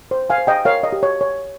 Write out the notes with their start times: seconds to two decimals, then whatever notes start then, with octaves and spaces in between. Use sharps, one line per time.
0.11 C5
0.30 F5 G#5
0.38 C5
0.47 D#5 G5
0.65 A#4 C#5 F5
0.83 D#5
0.93 G4
1.03 C#5
1.21 C#5